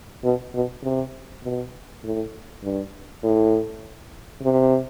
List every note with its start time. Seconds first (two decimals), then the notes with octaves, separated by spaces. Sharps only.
0.24 B2
0.54 B2
0.84 C3
1.44 B2
2.04 A2
2.63 G2
3.23 A2
4.43 C3